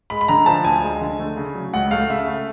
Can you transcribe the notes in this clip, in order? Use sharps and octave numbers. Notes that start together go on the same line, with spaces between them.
G#3 B5
B5
D3 A#5
F3 A5
D2 G#5
G#3
D3
A3
C#3
F#3
C#2 F#5
A3 F5
C#3 E5
A3